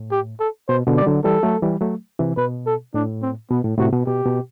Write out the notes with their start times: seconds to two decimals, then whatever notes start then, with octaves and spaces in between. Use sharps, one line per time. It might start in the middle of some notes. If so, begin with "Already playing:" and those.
Already playing: A2
0.12 G4
0.40 A4
0.68 B2 C5
0.87 B2 D3
0.97 D5
1.02 G3
1.06 D3 F#3
1.24 E3 G3 A4
1.43 F#3 A3
1.62 E3 G3
1.81 F#3 A3
2.19 C3 E3
2.37 B2 B4
2.66 A4
2.94 A2 D4
3.22 C4
3.51 B2 B3
3.64 A2
3.78 A2 C3 F#4
3.93 B2
4.06 B2 G4
4.26 B2